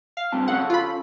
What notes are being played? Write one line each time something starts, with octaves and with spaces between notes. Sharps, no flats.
F5
G2 C4 A5
C#4 A4 F5 F#5
F4 B5